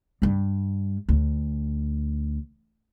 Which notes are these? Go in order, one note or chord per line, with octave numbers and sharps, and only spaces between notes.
G2 G3
D2